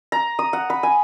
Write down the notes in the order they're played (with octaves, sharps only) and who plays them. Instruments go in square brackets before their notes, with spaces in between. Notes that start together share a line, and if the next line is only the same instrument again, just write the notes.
[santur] A#5
D#6
F#5
B5
G#5